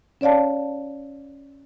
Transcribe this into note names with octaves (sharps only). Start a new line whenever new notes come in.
C#4 C#5 D5 F5 A5